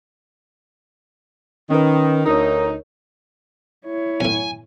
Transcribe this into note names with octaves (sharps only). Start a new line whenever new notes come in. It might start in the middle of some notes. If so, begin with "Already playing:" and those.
D#3 C#4 B4
D2 D#4 A#4 C#5
E4 C#5
B1 A2 G#5